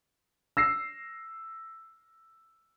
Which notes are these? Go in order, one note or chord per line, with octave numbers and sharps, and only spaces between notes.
E6 A#6 C7